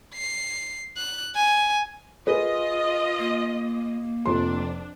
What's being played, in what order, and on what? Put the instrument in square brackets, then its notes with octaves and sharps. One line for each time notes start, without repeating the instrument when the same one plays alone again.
[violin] C7
F#6
G#5
[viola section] F4 D#5 [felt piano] G#4 A#4 B4
[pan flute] A#3
[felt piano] F1 F2 C6 [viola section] D4